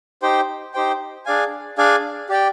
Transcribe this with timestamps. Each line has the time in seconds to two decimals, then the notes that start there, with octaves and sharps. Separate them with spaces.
0.22 D#4 G4 C5 G5
0.74 D#4 G4 C5 G5
1.26 D4 G#4 D5 F5 G#5
1.78 D4 G#4 D5 F5 G#5
2.29 G4 D5 G5